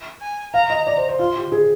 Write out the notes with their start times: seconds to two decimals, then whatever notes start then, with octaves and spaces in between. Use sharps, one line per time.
0.21 G#5
0.54 F5 A#5
0.70 D#5
0.87 D5
0.97 C5
1.09 C5
1.19 F4 C6
1.36 G4
1.52 G#4